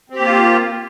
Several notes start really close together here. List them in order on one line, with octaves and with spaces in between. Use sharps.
C4 G4 A#3 F4